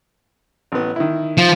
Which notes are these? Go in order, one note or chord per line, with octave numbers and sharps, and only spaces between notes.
A1 B3
D#3 E4
F3